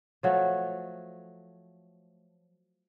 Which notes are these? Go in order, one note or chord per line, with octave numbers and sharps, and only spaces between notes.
F3 F#3 A3